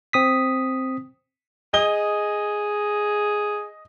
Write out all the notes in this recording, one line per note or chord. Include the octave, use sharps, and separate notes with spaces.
C4 D#6 B6
G#4 D#5 G7